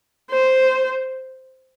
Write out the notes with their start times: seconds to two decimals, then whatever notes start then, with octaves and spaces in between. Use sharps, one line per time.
0.31 C5